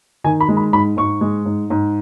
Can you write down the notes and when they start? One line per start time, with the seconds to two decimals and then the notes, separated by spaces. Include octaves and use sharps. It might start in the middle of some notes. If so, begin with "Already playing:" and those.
0.24 D#3 G#5
0.40 B5
0.49 G#3
0.57 B5
0.73 G#2 B5
0.97 G#2 C#6
1.21 G#3
1.46 G#2
1.70 G#2